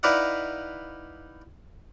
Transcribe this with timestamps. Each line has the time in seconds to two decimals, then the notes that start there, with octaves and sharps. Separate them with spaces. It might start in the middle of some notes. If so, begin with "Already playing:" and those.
0.03 D#4 E4 B4 D5 F5 F#5